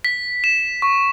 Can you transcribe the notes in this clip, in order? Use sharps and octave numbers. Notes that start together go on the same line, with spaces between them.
B6
E7
C#6